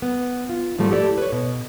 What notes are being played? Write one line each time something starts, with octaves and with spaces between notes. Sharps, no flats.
B3
F4
G#2 F3 G3 A3 A#3
E4 G4 A4 C#5 D5
B4 C#5
B2